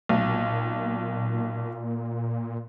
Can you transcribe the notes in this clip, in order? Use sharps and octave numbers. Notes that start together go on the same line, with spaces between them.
B1 A#2